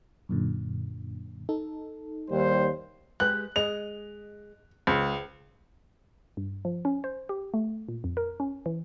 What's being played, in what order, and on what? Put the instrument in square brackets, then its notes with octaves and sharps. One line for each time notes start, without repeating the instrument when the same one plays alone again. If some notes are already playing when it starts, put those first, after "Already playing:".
[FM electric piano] F#2 A#2 D3
D#4 A4
[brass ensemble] D#2 G3 C5
[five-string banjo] G#3 G4 B4 [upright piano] F#6
[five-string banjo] G#3 G#4 D#5 [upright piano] F7
[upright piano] C#2 [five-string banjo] C4
[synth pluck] G2
F3
C#4
C5
G4
A3
A#2
F2
A#4
C#4
E3